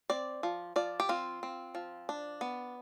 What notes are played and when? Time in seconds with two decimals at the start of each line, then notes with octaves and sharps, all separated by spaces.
0.10 C4 D5
0.43 F3
0.76 F3 D5
1.00 G4
1.09 C4 F4
1.43 C4
1.75 F3
2.09 D4
2.41 B3